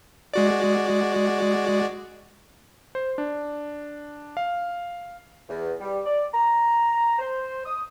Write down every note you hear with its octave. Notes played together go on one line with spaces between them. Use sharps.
G#3 F#4 D5
C5
D4
F5
E2
G3
D5
A#5
C5
D#6